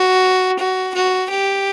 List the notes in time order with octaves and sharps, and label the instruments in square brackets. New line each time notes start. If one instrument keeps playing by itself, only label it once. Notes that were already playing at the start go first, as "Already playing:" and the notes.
Already playing: [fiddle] F#4
F#4
F#4
G4